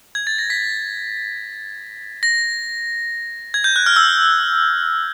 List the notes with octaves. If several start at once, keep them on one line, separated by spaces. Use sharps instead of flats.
G#6
A6
A#6
B6
A#6
G#6
G6
F#6
F6
E6